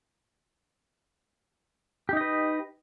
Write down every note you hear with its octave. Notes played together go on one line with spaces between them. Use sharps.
D#4 G4 B4 D#5